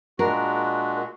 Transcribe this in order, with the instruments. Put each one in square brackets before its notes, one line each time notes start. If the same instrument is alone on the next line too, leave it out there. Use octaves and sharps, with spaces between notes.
[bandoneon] A#2 G#3 D4 F#4 [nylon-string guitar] A#4